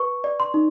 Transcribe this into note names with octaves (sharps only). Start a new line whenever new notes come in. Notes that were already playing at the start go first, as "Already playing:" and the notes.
Already playing: B4 C#6
D5
C6
D#4